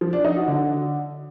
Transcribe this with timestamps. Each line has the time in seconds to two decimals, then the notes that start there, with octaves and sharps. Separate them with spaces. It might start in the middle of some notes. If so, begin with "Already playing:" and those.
0.01 F3
0.13 D4
0.25 D#4
0.36 F#4
0.48 D3